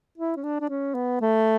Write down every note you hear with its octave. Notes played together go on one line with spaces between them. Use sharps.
E4
C#4
D4
D4
C#4
B3
A3